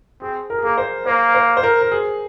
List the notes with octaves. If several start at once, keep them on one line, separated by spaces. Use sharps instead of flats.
C4 G#4
A#4
G#4
A#3 A#4
C5
A#3 C5
C5
C5
A#4
A#4
G#4